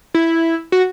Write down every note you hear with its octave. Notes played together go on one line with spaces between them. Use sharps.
E4
F#4